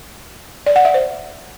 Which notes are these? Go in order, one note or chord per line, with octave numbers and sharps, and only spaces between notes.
D5
F#5
E5
C5